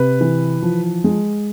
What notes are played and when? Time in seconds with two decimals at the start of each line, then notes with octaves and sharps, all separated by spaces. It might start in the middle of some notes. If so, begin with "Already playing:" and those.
Already playing: C3 B4
0.21 E3
0.62 F3
1.04 G#3